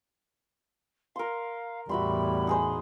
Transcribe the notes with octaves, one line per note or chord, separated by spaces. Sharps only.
A#4 F5 C6
E2 A2 G3 F#4 E5 B5 C6
D#4 G#4 C5